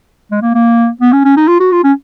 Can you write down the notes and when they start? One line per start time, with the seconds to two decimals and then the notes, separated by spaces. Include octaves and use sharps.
0.31 G#3
0.42 A#3
0.55 A#3
1.01 B3
1.12 C#4
1.25 C#4
1.37 D#4
1.48 F4
1.60 F#4
1.72 F4
1.84 C#4